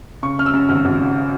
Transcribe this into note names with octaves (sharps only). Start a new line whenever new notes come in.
C#3 C#6
F#2 F6
E6
F#2
G#1 F6
G#1
C#3